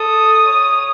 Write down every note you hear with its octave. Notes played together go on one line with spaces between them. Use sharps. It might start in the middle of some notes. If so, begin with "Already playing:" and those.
Already playing: A4 D#6
C#5